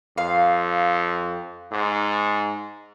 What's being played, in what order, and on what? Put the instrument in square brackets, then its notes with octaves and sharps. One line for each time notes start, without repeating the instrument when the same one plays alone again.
[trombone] F2 [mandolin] F5
[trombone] G#2